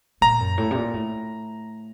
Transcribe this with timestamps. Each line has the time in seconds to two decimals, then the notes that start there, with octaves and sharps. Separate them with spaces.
0.21 A#2 A#5
0.40 F#2
0.58 A2
0.71 C3
0.75 A#2
0.94 A2